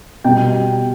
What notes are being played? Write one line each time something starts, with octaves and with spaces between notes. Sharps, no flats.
B2 G3 G5